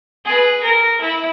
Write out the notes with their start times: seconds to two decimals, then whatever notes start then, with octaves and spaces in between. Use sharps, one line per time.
0.25 G#4 B4
0.63 A#4
1.01 E4